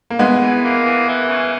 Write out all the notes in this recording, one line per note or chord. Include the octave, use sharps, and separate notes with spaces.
A#3
E3 G#3 B3
E3
A#3
E3
E3
C#3